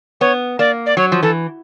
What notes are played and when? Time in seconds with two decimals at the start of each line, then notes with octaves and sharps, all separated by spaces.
0.21 B3 C#5
0.59 A#3 D5
0.86 D5
0.97 F#3 C#5
1.12 F3
1.23 E3 A4